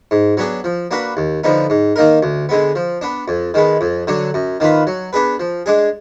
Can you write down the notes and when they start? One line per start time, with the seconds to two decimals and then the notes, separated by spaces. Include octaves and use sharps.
0.11 G#2
0.37 F#3 B3 D4 G#4
0.64 F3
0.91 A#3 D4 F#4 B4
1.17 D#2
1.44 D3 F3 B3 D#4
1.70 G#2
1.96 D#3 A#3 D#4 A#4
2.23 D2
2.49 D3 G#3 B3
2.75 F3
3.01 B3 D4
3.28 F2
3.54 D#3 G#3 B3
3.81 F2
4.07 D3 F#3 D4
4.34 F#2
4.60 D#3 A#3 F4 B4
4.87 F#3
5.13 B3 D4 G#4 B4
5.40 F3
5.66 G#3 D4 G#4